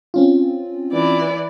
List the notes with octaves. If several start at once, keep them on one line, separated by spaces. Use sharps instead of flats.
C4 C#4 F4
E3 D5